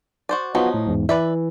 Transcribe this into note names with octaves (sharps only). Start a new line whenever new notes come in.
F#4 C5 D5
F3 F#3 B3 D#4 F4 F#4
A2
E2 G#2
E3 B4 D5 E5